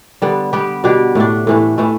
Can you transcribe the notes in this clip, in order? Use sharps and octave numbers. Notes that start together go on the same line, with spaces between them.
D3 G3 B3
G3 B3 G4
B2 G3 D4 G4
A2 A3 D4
A2 E3 A3
A2 E3 A3 E4